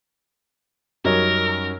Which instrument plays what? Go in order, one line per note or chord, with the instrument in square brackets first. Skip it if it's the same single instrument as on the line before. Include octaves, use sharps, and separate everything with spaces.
[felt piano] F#2 [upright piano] G3 D#4 C#5 [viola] A#4